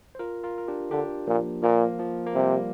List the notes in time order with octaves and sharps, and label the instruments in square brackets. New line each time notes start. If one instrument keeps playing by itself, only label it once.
[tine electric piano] C5
F4 A#4
F4 A#4
A#4
D4 G4
[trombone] D3 [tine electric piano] D4 G4
[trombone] A#2 [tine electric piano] F3 A#3
[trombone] A#2 [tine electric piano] F3 A#3
[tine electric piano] F3
A#3
[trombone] C3 [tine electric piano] G3